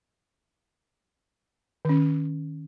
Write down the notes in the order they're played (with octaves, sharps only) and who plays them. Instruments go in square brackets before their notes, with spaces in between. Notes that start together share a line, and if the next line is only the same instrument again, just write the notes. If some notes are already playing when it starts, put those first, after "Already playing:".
[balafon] D#3 C#4